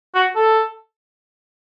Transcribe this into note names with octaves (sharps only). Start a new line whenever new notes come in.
F#4
A4